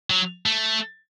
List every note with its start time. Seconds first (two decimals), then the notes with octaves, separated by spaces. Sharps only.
0.10 F#3
0.46 A3